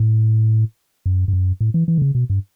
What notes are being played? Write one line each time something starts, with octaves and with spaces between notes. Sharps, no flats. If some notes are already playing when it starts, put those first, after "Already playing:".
Already playing: A2
F#2
G2
F#2
A2
E3
E3
D3
C#3
B2
G2